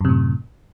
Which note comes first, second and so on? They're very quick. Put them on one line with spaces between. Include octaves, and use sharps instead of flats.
F#2 C3 A2